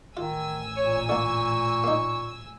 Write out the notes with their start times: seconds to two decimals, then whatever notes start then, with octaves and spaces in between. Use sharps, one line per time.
0.17 A1 D#3 F4 G#5 E6
0.76 A#2 C#5
1.09 D3 A#3 C#6
1.84 A#3 D#4